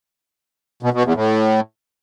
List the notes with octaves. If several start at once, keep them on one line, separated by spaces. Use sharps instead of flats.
B2
B2
E2
A2